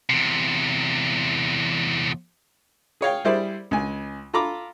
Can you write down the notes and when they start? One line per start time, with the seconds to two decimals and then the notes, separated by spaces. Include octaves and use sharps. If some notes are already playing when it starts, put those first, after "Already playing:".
0.09 E2 C3
3.01 G#4 C#5 F5 G5
3.25 G3 E4 G#4 C5 D5 E5
3.71 C#2 G#5
4.33 F4 A4 A#5 B5 D6